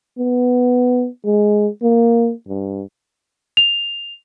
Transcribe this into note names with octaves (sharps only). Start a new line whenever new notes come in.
B3
G#3
A#3
G2
F7